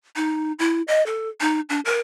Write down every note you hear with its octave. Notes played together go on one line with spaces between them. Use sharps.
D#4
E4
D#5
A4
D#4
D4
A#4